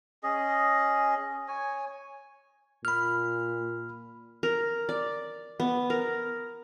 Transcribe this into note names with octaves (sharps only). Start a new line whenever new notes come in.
C#4 G#4 D#5
C#5 G#5
A#2 B5 F6
A#4
D5
B3
A#4